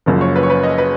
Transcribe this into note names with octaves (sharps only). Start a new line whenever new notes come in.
F#1 F#2 C#3 F3 A#3
C#5
B4
C#5
B4
D#5
B4